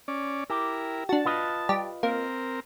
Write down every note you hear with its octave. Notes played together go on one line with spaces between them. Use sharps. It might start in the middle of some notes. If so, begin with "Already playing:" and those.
C#4 D5
E4 G4 A#4
D4 F#4 A5
F4 B4 D#5
G3 G4 A5
A#3 C4 A#4